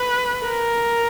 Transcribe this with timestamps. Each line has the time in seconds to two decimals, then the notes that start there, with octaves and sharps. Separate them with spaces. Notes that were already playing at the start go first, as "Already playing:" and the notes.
Already playing: B4
0.47 A#4